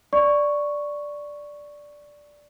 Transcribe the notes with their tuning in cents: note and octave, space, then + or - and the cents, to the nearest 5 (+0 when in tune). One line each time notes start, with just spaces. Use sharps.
D5 +0 C#6 +0